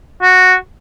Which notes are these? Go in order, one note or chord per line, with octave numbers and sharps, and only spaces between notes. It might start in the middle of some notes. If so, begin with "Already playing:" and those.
F#4